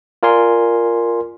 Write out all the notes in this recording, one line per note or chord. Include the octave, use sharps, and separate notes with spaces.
F4 A#4 D5 G#5 C6